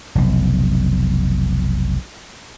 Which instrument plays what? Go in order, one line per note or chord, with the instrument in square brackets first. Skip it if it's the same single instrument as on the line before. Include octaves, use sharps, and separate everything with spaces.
[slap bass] F1 B1